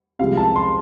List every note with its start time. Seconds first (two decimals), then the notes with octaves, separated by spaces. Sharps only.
0.19 C2 C3 F3 G#3 F5
0.37 A5
0.56 C6